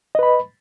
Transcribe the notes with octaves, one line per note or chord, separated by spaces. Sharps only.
B4 D#5 B5